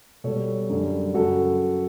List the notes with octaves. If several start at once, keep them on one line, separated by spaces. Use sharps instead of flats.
B2 G3 A4 C#5
F#2 D3 G3
F#2 C#3 F#3 F#4 A4